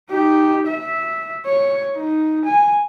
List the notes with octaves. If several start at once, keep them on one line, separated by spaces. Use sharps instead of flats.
D#4 G4
E5
C#5
D#4
G#5